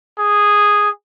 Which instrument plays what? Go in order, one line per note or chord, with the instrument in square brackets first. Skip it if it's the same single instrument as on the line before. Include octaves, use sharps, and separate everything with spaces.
[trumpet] G#4